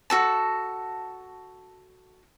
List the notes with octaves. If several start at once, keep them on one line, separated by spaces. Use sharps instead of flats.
F#4 A4 A5